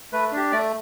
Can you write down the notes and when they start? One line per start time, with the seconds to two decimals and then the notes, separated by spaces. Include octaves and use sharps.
0.12 A3 B4
0.32 D4 G4
0.52 A3 D5